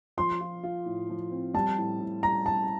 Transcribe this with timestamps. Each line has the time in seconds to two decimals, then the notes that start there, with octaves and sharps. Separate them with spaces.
0.17 F3 C6
0.40 F4
0.63 F4
0.86 A2
1.09 F3
1.31 C4
1.54 G3 A5
1.78 A2
2.00 A2
2.23 G3 A#5
2.46 G3 A5